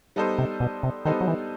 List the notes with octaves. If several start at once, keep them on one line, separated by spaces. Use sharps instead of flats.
G3 B3 D#4 A4 C5
C3
B2
C3
D#3 G3 B3 D#4 A4 C5
F#3
E3